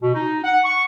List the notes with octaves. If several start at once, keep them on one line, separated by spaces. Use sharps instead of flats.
B2
D#4
F#5
C#6